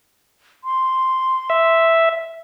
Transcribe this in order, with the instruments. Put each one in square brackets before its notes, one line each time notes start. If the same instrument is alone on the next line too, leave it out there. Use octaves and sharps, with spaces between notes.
[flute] C6
[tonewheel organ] E5